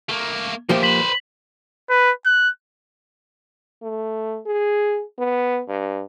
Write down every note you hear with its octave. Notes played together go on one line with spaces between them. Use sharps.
A3 A#3
A#2 E3 F3 A#3 G4
B4 C5 B6 F#7
B4
F#6
A3
G#4
B3
G2